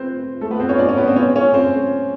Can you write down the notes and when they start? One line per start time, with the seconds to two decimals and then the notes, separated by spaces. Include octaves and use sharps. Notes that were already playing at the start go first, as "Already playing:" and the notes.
Already playing: C4 B4 C5
0.41 A3 A4
0.51 B3 B4
0.60 C4 C5
0.69 C#4 C#5
0.78 D4 D5
0.89 C#4 C#5
0.97 B3 B4
1.07 C4 C5
1.16 C#4 C#5
1.35 C#4 C#5
1.54 C4 C5